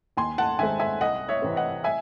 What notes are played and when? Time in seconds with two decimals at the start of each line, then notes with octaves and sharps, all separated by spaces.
0.17 D#2 G#5 C6
0.38 F#5 A5
0.59 D#3 G#3 C4 E5 G#5
0.80 E5 G#5
1.01 C2 D#5 F#5
1.29 C#5 E5
1.42 C3 E3 C4
1.56 D#5 F#5
1.84 E5 G#5